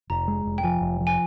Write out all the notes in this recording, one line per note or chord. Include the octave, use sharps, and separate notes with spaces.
F1 A#5
G#3
F1
G5
F3 G#5
F1
F3
G#5